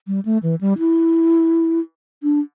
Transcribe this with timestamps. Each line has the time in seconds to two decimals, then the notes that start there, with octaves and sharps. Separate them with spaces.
0.07 G3
0.25 A3
0.43 E3
0.61 G3
0.79 E4
2.23 D4